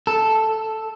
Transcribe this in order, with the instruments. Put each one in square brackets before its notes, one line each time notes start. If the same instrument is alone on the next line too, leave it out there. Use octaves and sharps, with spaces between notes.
[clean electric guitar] A4